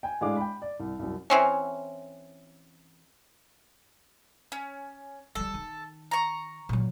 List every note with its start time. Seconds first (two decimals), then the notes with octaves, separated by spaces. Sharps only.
0.03 G5 G#5
0.21 A2 G#3 D4 F5 D6
0.37 G5 B5
0.62 D5
0.80 C2
0.99 C2 F#2
1.30 E3 C4 C#4
4.52 C#4
5.35 G3 G#3 A4
5.54 D#3
6.11 A#5 C#6
6.69 A#2 F#3